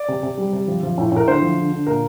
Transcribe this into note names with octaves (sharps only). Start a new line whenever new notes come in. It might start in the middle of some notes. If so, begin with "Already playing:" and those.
Already playing: D5
C3
C3
G3
C3
F3
F3
A2
A2 A#4
D3 C5
F3
D3
D3
A#2 A#4